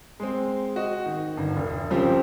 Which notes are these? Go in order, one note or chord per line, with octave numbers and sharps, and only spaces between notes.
G#3 C4
F#4 D#5
D#3
G1
E1
C#3 F3 C4 G4